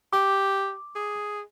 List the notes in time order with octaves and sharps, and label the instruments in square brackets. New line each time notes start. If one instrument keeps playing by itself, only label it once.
[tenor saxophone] G4 [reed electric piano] D6
[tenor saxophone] G#4